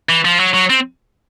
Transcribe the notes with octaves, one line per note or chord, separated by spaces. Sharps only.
E3
F3
F#3
F#3
C4